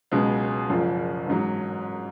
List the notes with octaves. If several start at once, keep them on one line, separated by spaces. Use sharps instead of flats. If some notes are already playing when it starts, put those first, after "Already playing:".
C#2 B2 F#3 G#3
F#1 F#2 F3
A1 G#2 F#3